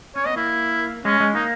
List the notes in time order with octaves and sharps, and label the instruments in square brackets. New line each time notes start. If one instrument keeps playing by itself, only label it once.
[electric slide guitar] C#4 [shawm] C#5
[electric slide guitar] B3 [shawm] D#5
[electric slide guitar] A#3 [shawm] E4
[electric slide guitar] G#3 [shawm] C#4
[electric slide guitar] G#3
[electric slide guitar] A#3 [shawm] D#4